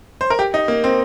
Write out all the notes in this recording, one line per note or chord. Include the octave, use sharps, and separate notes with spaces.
C5
A#4
G4
D#4
A#3
C4